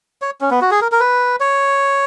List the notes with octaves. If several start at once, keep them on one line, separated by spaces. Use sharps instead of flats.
C#5
C#4
B3
F#4
G#4
A#4
A#4
B4
C#5